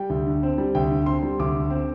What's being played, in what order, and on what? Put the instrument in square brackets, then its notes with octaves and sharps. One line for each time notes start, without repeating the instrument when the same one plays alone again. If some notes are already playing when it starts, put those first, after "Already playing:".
Already playing: [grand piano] G3 G5
D2
D3
C4
G3
D2 G5
D3
C4 C6
G3
D2 D6
D3
C4